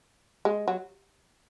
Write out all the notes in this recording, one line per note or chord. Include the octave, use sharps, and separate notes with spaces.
G#3
F#3